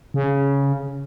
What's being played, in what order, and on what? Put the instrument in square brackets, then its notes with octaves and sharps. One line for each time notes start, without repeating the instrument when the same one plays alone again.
[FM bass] C#3